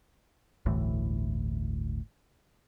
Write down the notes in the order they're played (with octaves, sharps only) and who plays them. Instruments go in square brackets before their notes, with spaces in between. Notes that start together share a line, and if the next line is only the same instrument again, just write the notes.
[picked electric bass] G1 D2 A2 E3